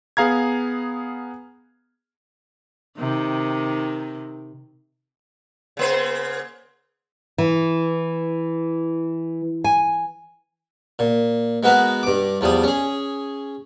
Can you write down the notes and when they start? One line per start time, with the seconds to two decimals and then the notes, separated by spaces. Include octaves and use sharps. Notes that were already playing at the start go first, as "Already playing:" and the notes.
0.17 B3 G#4 F5 A#5 G#6
2.98 C3 D#3
5.77 C#3 A#3 C5
7.38 E3
9.64 G#5
10.99 A#2
11.63 G#3 B3 F#4 A#4 B4
12.03 G2 D6
12.41 E2 F3 G3 D#6
12.64 C#4 G#4